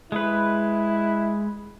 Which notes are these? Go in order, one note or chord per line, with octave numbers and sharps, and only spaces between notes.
G#3 E4 B4